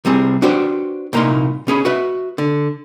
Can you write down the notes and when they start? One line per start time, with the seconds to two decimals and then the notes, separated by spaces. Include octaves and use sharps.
0.05 C2 G3 C4 G#4
0.42 D4 F#4 G4 B4 C5
1.13 C2 A#2 A#3 D#4 C6
1.67 B2 C#4 G#4 B5
1.85 F#4 B4 E5
2.38 D3